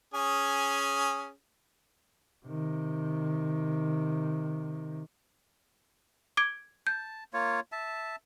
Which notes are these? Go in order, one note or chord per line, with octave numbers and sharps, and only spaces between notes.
C#4 G#4
C3 D#3
D6 G#6 D7
A5 G6
A#3 F4 C#5
E5 A5